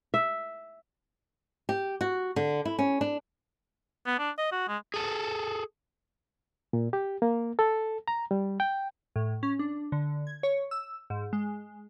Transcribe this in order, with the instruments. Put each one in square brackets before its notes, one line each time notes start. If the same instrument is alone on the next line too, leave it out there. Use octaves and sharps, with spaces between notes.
[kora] E5
[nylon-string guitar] G4
F#4
D3
E4
C#4
D4
[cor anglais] B3
D4
D#5
F#4
G#3
[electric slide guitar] G#4 A4
[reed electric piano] A#2
G4
A#3
A4
A#5
G3
G5
[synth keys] A2
C#4
D4
D3
G#6
C#5
E6
G#2
G#3